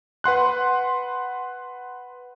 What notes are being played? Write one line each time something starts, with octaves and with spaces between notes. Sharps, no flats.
B4 F#5 C6 F#6